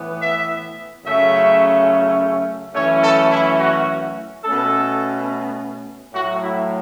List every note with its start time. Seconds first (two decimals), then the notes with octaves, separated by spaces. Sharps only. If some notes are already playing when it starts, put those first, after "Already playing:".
Already playing: A2 E3 B3
0.20 E5
1.06 F#2 C#3 A3 C#4 E5
2.75 F#2 E3 A3 C#4 C#5
3.04 A4
3.31 E4
3.60 F#4
4.44 B2 A3 C#4 A4
6.14 A2 F#3 A3 F#4
6.42 E4